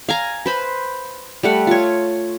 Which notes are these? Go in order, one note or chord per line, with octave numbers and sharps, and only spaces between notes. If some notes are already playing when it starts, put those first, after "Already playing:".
F5 G#5 A#5
B4 C5 B5
G3 A3 F#5
F4 C#5